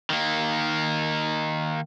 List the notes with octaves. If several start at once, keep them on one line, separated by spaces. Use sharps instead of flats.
D#3 A#3